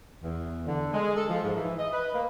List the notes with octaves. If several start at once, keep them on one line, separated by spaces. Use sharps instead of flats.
E2
D3
G#3
A4
F3
G#2
E3
D#5
B4
A#3